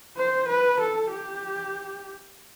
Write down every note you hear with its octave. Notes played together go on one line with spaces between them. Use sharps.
C5
B4
A4
G4